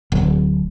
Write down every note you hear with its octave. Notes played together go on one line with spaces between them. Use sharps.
D1